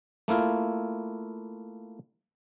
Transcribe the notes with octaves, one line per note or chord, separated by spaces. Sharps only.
A3 A#3 E4 F4